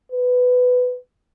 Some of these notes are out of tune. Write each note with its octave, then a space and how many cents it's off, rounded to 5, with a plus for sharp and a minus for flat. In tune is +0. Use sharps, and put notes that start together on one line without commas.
B4 +10